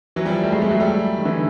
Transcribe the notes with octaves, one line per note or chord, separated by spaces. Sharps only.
E3 F#3
F3 G3
G3 A3
F#3 G#3
G3 A3
F#3 G#3
G3 A3
D#3
D3 E3